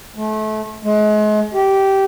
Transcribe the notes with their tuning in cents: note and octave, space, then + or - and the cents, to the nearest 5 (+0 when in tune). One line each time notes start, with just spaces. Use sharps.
A3 -30
G#3 +35
G4 -15